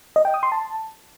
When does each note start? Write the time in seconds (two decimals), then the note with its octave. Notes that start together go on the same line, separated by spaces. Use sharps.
0.16 D#5
0.25 G5
0.34 D#6
0.43 C6
0.52 A5